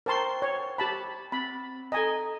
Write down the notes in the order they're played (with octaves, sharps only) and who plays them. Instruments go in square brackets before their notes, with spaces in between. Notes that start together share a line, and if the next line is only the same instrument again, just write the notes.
[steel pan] A#4 A5 C6 [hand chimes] C5 G5 C#6
[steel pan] C#5
G4 A5 B5
[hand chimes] C4 A6 [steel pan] B5
[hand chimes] A4 A#5 [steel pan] D#5 G#5